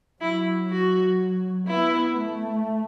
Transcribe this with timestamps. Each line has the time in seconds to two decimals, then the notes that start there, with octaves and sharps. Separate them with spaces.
0.21 F#3 E4
0.70 F#3 F#4
1.67 B3 E4
2.16 A3